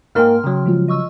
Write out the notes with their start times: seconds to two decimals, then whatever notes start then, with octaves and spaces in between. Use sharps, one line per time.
0.15 G#2 A#3 A#4 G5 C6 F6
0.44 C#3 F#3
0.66 F3 G#3 F4
0.88 D#5 C#6 E6